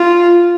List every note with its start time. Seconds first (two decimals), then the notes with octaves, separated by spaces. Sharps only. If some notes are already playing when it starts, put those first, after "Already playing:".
Already playing: F4